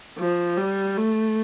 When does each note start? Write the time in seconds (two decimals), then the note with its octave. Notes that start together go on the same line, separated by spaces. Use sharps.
0.18 F3
0.58 G3
0.97 A3